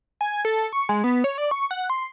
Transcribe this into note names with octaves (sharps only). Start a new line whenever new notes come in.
G#5
A4
C#6
G#3
B3
C#5
D5
C#6
F#5
C6